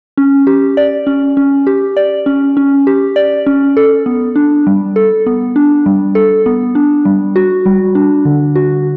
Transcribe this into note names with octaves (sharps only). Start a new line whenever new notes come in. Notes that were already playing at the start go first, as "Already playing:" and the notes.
C#4
G4
D5
C#4
C#4
G4
D5
C#4
C#4
G4
D5
C#4
A4
B3
D4
G3
A4
B3
D4
G3
A4
B3
D4
G3
F#4
G3
D4
D3
F#4